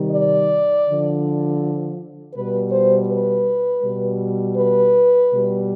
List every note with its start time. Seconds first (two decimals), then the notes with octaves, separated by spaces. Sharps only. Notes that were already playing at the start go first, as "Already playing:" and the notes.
Already playing: C3 D#3 G3
0.12 D5
0.86 D3 F3
2.35 B2 G3 B4
2.72 C5
3.09 B4
3.83 B2 G3
4.57 B4
5.32 B2 G3